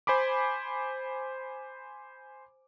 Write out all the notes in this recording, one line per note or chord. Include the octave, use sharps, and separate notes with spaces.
C5 G#5 B5 D6